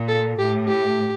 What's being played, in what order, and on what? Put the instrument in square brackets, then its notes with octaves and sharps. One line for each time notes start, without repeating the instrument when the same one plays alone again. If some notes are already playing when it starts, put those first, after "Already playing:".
Already playing: [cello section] A#2
[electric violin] A4
[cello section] A2 [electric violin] G4
[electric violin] G4